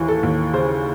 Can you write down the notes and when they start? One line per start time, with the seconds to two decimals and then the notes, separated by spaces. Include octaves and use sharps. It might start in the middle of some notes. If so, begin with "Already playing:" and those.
Already playing: D#2 E3
0.08 A4
0.23 D#2
0.53 C#3 C5